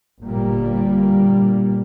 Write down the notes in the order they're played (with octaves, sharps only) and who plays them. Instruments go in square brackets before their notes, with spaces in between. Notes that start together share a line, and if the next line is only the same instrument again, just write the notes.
[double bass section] G1 A#2 G3 A#3